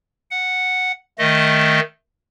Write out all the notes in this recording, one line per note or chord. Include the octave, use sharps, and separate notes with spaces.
F#5
D#3 A3 D#5